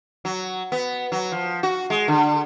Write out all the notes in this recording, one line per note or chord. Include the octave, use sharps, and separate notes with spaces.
F#3
B3
F#3
F3
F#4
G#3
D3